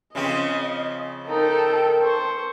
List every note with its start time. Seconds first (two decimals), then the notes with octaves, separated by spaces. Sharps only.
0.15 C#3 F3 C4 D#5
1.28 D#4 A4 A#4 G5
2.02 C5 C#6